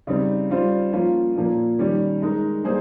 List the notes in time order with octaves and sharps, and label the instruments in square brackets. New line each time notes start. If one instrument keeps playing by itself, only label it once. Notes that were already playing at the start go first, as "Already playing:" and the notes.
[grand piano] C#3 G3 C4 D#4
G3 C#4 F4 C5
F3 A#3 C#4 F4
A#2 F3 A#3
D#3 G3 C#4 G4
G#3 D#4 A#4
G3 A#3 D#4 G#4 C5